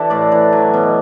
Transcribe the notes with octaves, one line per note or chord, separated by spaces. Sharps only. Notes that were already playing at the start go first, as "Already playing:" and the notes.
Already playing: E3 D4 G4 A4
A2 D5
E3
F#3
B2